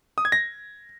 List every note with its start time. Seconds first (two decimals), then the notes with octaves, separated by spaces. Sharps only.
0.18 D#6
0.25 G#6
0.32 A#6